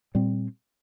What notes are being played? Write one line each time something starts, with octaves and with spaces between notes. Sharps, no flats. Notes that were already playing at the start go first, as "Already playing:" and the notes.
A#2 G3 C4